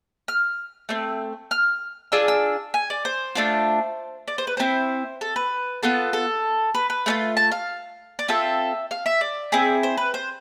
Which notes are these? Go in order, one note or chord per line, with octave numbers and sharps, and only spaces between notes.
F6
A3 C4
F6
D4 F4 G#4 E6
E6
G#5
D5
C5
A3 D4 F4
D5
C5
B4
C4 E4 A4 C5
A4
B4
B3 F4 A4
A4
B4
B4
A3 D4 F4
A5
F5
D5
C4 F4 A4 E5
F5
E5
D5
C4 E4 G#4
C5
B4
C5